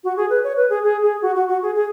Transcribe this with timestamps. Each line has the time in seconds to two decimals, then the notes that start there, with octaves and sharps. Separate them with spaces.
0.04 F#4
0.17 G#4
0.30 B4
0.44 C#5
0.56 B4
0.70 G#4
0.83 G#4
1.03 G#4
1.22 F#4
1.36 F#4
1.48 F#4
1.62 G#4
1.75 G#4